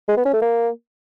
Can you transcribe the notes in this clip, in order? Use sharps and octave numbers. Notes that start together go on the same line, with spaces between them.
G#3
B3
C#4
A3
A#3